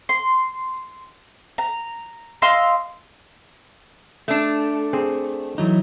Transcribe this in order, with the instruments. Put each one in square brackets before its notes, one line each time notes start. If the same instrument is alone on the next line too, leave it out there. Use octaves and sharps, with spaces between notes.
[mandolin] C6
A#5
D#5 F5 C6 E6
[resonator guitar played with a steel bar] A3 D4
[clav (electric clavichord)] C4 G#4 C5
[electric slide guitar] E3 F#3 D#4